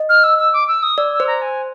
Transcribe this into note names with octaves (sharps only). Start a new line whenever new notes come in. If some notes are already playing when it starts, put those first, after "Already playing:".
Already playing: D#5
F6
E6
E6
D6
E6
D#6
D5 E6
E6
C5
A#5
G#5